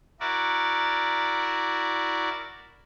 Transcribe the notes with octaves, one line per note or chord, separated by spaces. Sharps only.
E4 F#4 A#4 D5